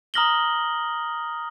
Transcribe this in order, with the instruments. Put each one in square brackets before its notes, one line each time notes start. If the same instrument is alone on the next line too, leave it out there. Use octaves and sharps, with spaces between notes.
[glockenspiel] A#5 D#6 F6 A#6 F#7 G7